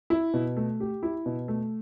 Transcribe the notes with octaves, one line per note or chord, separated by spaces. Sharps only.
E4
B2
A3
G4
E4
B2
A3